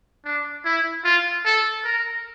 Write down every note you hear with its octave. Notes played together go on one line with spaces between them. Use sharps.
D4
E4
F4
A4
A#4